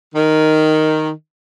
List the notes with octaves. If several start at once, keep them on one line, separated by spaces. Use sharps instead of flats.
D#3